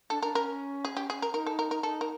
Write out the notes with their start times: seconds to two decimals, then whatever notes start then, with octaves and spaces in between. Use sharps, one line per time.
0.10 D4 A4
0.22 D4 A#4
0.35 C#4 A#4
0.85 G#4
0.97 G4
1.10 G#4
1.22 A#4
1.34 D#4 A#4
1.46 A4
1.59 A#4
1.71 A#4
1.83 D#4 A4
2.01 A#4